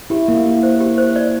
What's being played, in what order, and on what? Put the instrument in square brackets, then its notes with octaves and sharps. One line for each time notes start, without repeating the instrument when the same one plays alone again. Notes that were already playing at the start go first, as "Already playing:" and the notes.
[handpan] E4 [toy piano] G4
[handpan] A#3 [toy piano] E5
[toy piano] G4
C5
G4
C5
D5